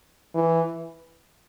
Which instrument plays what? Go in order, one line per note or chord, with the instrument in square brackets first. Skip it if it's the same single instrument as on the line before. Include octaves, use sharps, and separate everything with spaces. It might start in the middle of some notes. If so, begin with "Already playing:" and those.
[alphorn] E3